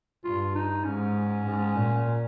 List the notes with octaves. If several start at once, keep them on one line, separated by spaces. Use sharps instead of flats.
G2 F4
D#4
G#2 C#4
G#2
A#2